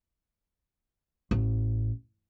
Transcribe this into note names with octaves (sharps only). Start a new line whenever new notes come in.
A1